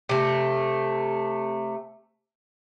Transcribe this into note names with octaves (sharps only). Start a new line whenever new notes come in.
C3 A3